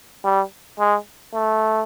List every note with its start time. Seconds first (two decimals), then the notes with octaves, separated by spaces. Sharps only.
0.25 G3
0.79 G#3
1.34 A3